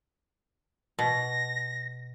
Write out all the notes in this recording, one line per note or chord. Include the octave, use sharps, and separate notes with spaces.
B2 A#6